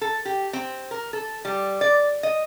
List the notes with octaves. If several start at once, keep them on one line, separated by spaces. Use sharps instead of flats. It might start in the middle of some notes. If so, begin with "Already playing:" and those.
A4
G4
C4
A#4
A4
G3
D5
D#5